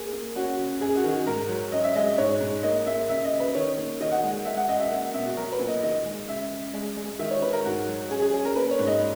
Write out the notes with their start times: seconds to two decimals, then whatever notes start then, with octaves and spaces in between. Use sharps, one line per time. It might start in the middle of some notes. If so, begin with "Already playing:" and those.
Already playing: A#3 G#4
0.13 A#3
0.36 C#4 F#4
0.59 C#3
0.81 F#2 G#4
0.96 F#4
1.04 D#3
1.27 G#2 A#4
1.49 F#3
1.72 C#4 D#5
1.84 E5
1.95 G#3 D#5
2.07 D#5
2.18 G#2 C#5
2.41 G#2
2.63 A#3 D#5
2.86 A#3 E5
3.09 C#3 E5
3.24 D#5
3.32 C#3
3.40 B4
3.55 D#3 C#5
3.77 A#3
4.01 D#3 D#5
4.11 F#5
4.23 G#3
4.45 G#3 E5
4.57 F#5
4.68 F#2 D#5
4.80 E5
4.91 A#3 F#5
5.14 B2 E5
5.26 F#4
5.37 F#3 A#4
5.52 B4
5.59 A#2
5.67 D#5
5.83 D#3 D#5
6.05 G#3
6.28 C#3 E5
6.51 C#3
6.74 G#3
6.97 G#3
7.19 D#3 E5
7.31 C#5
7.42 D#3 B4
7.53 A#4
7.64 G#2 F#4
7.88 F#3
8.10 C#4 G#4
8.22 G#4
8.33 C#4 G#4
8.45 A#4
8.56 A#3 B4
8.71 C#5
8.79 G#2
8.87 D#5